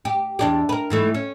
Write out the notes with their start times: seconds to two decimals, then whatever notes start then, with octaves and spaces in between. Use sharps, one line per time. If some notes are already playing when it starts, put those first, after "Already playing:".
0.05 G4
0.39 E2 D4 G4
0.69 A#4 B4
0.90 G#2 E3 A3
1.14 C#4